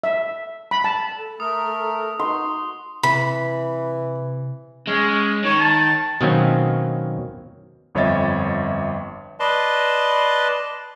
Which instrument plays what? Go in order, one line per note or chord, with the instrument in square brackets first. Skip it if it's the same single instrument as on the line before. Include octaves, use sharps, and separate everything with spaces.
[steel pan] E5
B5
A5
[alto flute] A4
[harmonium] A3 A#4 [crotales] D#6
[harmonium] D#4 [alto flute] F#4 [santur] C6
[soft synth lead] C3 [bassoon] E3 [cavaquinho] B5
[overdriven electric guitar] G#3 [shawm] C#4
[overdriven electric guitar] D#3 [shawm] C#5
[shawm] A5
[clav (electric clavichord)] B2 D#3 F#3 A#3 C4 C#4
[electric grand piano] G1 F2 C#5 D#5 E5 A6
[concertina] B4 D5 D#5 A5 C6